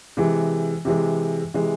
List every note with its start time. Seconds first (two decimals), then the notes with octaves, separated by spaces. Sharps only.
0.17 C3 E3 G#3
0.85 C3 E3 G#3
1.54 C3 E3 G#3